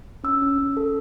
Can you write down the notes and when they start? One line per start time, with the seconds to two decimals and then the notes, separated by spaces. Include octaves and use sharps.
0.24 C#4 E6
0.42 C#4
0.58 C#4
0.77 A4